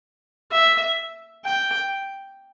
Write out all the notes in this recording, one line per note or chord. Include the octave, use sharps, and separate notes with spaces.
E5
G5